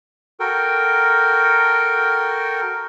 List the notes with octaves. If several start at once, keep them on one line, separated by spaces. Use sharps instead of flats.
F#4 A4 A#4 G5